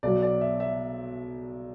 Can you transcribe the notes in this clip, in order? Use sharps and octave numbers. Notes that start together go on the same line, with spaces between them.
B1 B2 F#3 D5
D5
E5
E5